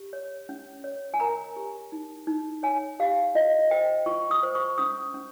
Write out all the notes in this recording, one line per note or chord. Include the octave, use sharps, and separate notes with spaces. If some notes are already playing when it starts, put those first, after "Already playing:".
Already playing: G4
C#5
C#4
C#5
G#5
A#4 A#5
G4
D#4
D#4
C#5 G#5
G4 F5
F4 D#5
C5 G5
F4 C#6
D#6
C5
C#6
C#4 D#6
C#4